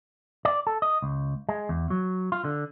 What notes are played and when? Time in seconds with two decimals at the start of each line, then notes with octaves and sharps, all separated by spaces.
0.45 D5
0.67 A4
0.82 D#5
1.02 C#2
1.49 G#3
1.69 E2
1.90 F#3
2.32 F4
2.44 D3